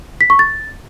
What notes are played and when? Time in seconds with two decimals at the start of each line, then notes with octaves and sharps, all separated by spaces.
0.21 B6
0.30 C#6
0.39 A6